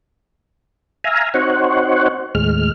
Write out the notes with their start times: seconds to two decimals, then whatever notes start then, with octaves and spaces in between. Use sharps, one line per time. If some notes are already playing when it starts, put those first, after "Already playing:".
1.04 E5 F5 G#5 A#5
1.34 C4 D#4 F#4 C5 C#5 F#5
2.35 D#2 A2 G#3 F6